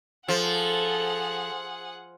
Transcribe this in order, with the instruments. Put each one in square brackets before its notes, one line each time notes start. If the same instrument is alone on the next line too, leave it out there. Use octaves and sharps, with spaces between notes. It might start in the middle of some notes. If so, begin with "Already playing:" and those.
[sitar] F3 [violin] G#4 F#5 [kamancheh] A4